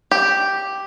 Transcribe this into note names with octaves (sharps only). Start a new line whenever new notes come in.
G4